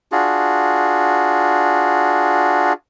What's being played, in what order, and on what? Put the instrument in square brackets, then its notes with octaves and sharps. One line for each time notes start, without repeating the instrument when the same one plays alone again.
[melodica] D4 F4 F#4 G#4